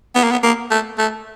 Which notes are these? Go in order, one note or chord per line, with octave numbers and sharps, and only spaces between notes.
B3
A#3
B3
A#3
A3
A3